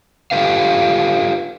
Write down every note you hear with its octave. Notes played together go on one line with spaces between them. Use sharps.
F4 G4 A4 B4 F5